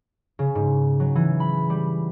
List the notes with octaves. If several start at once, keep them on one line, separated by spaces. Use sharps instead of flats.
C#3
G#2
F#3
E3
B5
G3